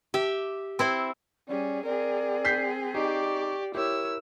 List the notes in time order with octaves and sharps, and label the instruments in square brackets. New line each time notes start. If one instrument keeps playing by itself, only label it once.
[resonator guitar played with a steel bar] G4 [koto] E5
[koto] C4 E4 C5
[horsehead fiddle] G3 G#4 [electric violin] C#4 [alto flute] D5
[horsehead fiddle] C4 G#4 [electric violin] A#4 [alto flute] D5
[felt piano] G6 B6 C7
[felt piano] D#4 [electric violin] G4 D5 [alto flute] C#6
[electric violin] E4 E6 [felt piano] G4 [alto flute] A#4 [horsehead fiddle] C#5